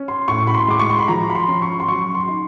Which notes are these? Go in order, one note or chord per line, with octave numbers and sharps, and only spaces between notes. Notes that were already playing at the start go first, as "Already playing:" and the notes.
Already playing: C#4
C6
A2 C#6
B5
C6
G#3 D6
C#6
C6
B5
F3 A#5
B5
C6
C#4
C#6
C6
F#3 C#6
C6
D#4